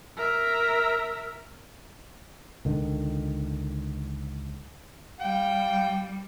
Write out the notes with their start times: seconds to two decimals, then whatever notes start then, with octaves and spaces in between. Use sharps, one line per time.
0.17 A#4 E5
2.65 C#2 D3 D#3
5.20 G3 F5 G5